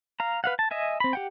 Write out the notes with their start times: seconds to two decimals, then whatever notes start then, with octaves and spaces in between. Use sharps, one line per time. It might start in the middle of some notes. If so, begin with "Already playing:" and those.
0.20 F5 A#5
0.44 B4 F5 F#5
0.59 A5
0.71 D#5 E5 G#5
1.00 C4 B5
1.13 G4 F#5 G5